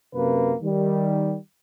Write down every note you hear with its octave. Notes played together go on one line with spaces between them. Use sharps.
F#2 C3 A#3 B4
D#3 G3